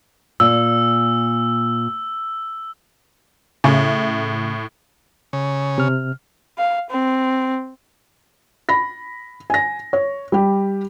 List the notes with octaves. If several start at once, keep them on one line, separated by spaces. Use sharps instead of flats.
A#2 E6
A2 C#3
C#3
C3 F6
F5
C4
B5 A#6
G#5 A#6
C#5
G3 G4